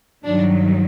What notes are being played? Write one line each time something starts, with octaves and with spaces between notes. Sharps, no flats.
G2 D#3 F#3 D4